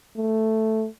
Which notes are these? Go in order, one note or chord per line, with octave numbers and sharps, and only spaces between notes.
A3